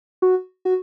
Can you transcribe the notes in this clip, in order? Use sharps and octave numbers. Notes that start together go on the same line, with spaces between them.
F#4
F#4